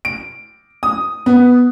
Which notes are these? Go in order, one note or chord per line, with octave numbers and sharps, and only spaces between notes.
D7
D#6
B3